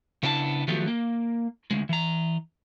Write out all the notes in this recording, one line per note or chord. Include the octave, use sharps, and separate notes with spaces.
C#3 B3 D4 E4 G#5 A5
D#3 F3 F#3 A3 B3 G4
A#3
D2 G#3
E3 A#5